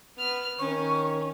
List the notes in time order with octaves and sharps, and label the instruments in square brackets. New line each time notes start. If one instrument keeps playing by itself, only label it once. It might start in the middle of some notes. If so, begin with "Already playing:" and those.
[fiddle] B3 F6
[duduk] D#3 [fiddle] C#4 [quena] C#6